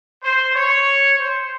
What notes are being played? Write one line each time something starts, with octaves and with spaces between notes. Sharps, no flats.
C5
C#5
C5